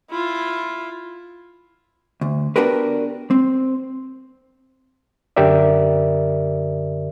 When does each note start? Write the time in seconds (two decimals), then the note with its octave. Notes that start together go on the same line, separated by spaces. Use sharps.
0.11 E4 F4
2.21 D2
2.56 B3 D4 F#4 G4 A#4 B4
3.31 C4
5.36 F#2 D3 G4 A#4 D5 E5